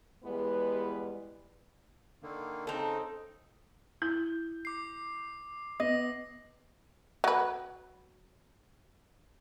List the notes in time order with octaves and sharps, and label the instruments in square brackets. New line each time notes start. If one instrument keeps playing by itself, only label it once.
[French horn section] E2 G3 G#3 B3 E4 B4
[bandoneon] D3 D#3 A#3
[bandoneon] C#3 D#4 [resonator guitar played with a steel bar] C4 A4
[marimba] E4 [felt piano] G6
[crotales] D6 C7
[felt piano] B3 [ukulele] D#5 [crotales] D#6 A#6
[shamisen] F#3 B4